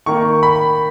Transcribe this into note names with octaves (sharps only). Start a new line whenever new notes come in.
D#3 A#3 C#6
B5